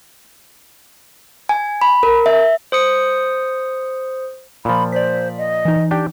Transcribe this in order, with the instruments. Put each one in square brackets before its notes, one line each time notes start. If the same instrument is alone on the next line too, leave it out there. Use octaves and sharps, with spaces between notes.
[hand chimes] G#5
B5
A#4
E5
[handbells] C5 D#6 C#7
[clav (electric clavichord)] A#2 F3 [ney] B5
[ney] C5 [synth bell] D5 B6
[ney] D#5
[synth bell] E3 D#4
[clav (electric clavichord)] D4 G4 G5